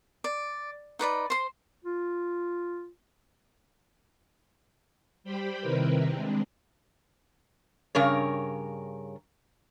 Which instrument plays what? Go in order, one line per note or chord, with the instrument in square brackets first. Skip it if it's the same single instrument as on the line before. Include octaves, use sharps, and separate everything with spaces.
[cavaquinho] D5
D#4 B4 D5 B5
C5 C6
[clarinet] F4
[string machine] G3 G4 C5 G5 B5
C3 D#3 C4 E4 A#4 B4
G#3 C4 D4
[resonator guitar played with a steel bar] G2 C#3 A#4 C#5